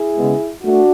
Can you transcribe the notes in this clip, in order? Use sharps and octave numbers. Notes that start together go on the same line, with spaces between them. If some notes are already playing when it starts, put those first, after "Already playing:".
Already playing: E4 G#4
C#3 G#3 B3
A3 D4 F#4